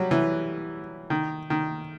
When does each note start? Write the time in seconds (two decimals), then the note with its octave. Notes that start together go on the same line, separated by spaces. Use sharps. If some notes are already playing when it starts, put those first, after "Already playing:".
Already playing: F#3 G3
0.11 E3
1.10 D#3
1.50 D#3